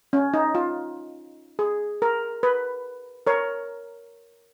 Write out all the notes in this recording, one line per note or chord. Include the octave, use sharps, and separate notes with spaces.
C#4
D#4
F4
G#4
A#4
B4
A#4 C#5